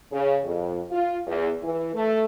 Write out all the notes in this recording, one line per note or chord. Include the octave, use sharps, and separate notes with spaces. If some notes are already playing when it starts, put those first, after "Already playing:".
C#3
F2
F4
E2
E3
A3